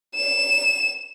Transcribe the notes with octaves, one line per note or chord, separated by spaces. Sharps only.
E7